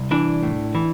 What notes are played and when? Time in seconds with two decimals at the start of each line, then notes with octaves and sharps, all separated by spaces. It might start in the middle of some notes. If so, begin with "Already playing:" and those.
Already playing: C2
0.11 E3 D4
0.43 A2
0.75 E3